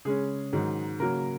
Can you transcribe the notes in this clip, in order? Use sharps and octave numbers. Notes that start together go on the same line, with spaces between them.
C#3 G#3 C#4 G#4
G#2 D#3 F#3
C#3 F#3 A#3 A#4